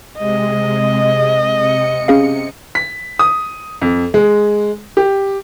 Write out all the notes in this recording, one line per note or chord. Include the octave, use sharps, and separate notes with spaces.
C3 G#3 D#5
C3 C#7
C#4 G#4 F5
B6
D#6
F2
G#3
G4